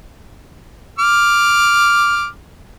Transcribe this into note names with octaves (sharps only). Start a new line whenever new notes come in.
D6 F6